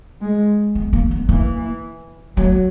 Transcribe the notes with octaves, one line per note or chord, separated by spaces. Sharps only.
G#3
B3
A#3
B3
E3 A#3
F#3 A#3